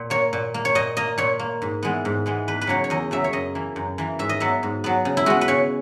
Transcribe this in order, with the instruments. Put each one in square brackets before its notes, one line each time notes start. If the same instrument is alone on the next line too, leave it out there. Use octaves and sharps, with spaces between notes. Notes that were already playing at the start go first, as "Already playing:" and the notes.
Already playing: [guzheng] A#2
A#3 C#5
A#2
A#3
C#5
A#2 D#5
A#3 D#5
A#2 C#5
A#3
G#2
E3 G#3 B3
G#2
E3 G#3 B3
E2 B4
B4
C#3 F#3 A#3 C#5
C#5
E2 D#5
C#3 F#3 A#3 E5
C#5
F#2 D#5
E3 A#3
F#2
E3 A#3
G#2 E5
D#5
F#3 B3 E5
G#2
F#3 B3
C#3
E4
G#3 B3 F#4
B4
C#3 C#5